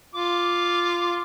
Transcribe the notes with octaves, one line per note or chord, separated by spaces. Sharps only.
F4 D6